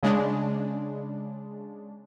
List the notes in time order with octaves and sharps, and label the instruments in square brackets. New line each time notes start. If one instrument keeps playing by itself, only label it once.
[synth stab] C#3 G#3 D4